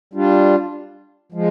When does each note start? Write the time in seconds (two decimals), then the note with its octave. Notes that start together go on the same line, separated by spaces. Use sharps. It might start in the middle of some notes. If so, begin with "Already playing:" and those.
0.14 G3 D4 F4
1.32 F3 G#3